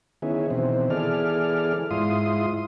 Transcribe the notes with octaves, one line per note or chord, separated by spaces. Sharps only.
D#3 B3 C#4 E4 G#4
B2 D#3 E3 C4
E3 B3 G#4 A4 D5 F6
G#2 E4 F4 C6 D#6